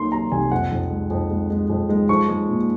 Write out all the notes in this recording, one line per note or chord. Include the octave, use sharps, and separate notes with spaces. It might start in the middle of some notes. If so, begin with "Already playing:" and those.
Already playing: C2 C3 F#3 A#3 C6
F#3 A#5
C2 G#5
F2 F#5
F2
G#3
F2
G#3
G#3
F2
G#3
F3 C#6
G#3
A#2